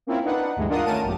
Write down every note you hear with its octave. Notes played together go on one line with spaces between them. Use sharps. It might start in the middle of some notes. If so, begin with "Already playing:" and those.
A#3 C4 C#4 E4 F4
D4 D#4 B4 F#5
D2 G2 E3 G#3
D4 F4 A#4 F#5 D#6
D#3 A3 C#4 A#4 A5 D#7
G#1 F#2 A#2 G4